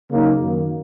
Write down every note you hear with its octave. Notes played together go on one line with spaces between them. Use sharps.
C#3 F#3 A#3 D#4
F#2 D#3 A#3